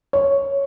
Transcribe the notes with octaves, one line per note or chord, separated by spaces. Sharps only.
C#5